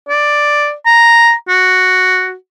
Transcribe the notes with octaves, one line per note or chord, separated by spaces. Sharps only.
D5
A#5
F#4